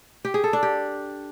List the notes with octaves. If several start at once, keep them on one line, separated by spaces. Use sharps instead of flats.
G4
G#4
A4
D4
G4